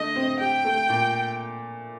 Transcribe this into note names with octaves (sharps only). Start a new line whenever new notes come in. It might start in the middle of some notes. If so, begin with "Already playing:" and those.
Already playing: D3 A3 D#5
C4
G4 G5
A3
A#2